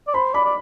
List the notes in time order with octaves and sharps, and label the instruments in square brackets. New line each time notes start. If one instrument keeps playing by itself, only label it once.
[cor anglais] D5
[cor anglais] C5 [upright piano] B5
[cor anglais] D5 [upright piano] B5
[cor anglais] D5